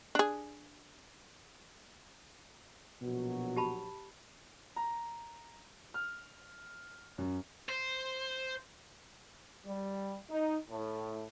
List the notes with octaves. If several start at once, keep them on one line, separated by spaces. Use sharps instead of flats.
D4 G#4
A#1 B2 F#3 F#4
G4 A5 B5
A#5
F6
F#2
C5
G3
D#4
A2